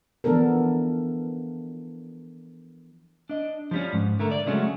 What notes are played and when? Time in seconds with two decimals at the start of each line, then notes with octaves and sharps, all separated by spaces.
0.24 E3 F3 B3 D4 A4 A#4
3.29 D4 D#5
3.71 F3 G3 C#4
3.93 G#2
4.19 D3 A3 A#4
4.31 D5
4.46 C#3 F#3 G#3 A3 C#4 F#4